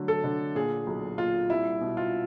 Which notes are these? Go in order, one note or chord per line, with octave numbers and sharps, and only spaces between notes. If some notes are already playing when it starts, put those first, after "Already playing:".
Already playing: D3 F#3 A3
A4
D3
A#2 G#4
B1
A#2 F4
C2 E4
B2
F4